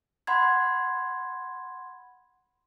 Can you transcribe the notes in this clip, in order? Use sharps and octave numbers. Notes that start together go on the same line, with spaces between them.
F#5 B5 C6 G#6